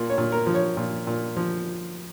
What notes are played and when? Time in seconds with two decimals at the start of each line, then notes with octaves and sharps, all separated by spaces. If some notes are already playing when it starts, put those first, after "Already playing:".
Already playing: A#2
0.10 C#5
0.18 A#2
0.32 A#4
0.46 F3
0.54 C#5
0.77 A#2
1.07 A#2
1.36 F3